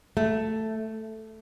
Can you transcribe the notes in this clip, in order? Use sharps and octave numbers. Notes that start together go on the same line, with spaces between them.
A3